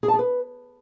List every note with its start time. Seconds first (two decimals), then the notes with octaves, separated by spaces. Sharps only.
0.03 G#4
0.08 A5
0.14 G#4
0.19 B4